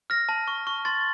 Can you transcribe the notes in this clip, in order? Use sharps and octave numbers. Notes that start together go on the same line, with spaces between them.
F6 A#6
A5
C#6
C#6
C6 A6